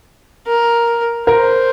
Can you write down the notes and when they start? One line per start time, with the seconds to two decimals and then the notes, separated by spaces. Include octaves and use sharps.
0.47 A#4
1.27 A#4 C5